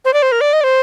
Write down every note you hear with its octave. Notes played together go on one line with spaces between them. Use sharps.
C5
D5
C5
A#4
D5
D#5
D5
C5